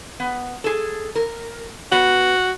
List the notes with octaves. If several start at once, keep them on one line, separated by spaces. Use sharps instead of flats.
B3
G#4 A4
A#4
B3 F#4